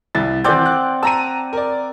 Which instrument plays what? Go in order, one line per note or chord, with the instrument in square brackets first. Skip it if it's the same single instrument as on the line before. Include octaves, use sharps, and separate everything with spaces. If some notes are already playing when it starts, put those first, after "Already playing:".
[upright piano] C2 E4 A6
[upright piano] E3 G6 [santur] C4 D5 F#5
[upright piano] F#6
[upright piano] A5 A#5 D#7 [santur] E6
[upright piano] A#4 D5